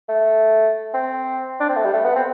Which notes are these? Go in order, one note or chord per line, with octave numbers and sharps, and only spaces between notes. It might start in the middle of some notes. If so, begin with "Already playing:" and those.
A3
C4
D4
C4
A3
G3
A3
B3
C4